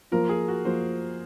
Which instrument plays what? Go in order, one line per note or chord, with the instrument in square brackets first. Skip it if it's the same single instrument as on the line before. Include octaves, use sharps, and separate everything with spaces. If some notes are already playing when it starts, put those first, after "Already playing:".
[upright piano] F3 A#3 F4 [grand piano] A#4
[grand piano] G#4
F#4
[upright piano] F3 A#3 F4 [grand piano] C5